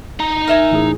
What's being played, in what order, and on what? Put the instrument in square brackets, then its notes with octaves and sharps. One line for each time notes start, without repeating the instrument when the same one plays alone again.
[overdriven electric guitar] D#4 A#5
[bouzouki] A#4 E5 G#5
[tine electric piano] A1 A2 G#4